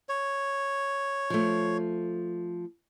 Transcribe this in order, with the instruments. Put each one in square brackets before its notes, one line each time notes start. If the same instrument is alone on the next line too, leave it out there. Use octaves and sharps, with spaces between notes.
[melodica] C#5
[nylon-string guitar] F3 A3